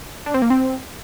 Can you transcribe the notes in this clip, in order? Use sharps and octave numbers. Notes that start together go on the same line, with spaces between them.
D4
C4
A#3
C4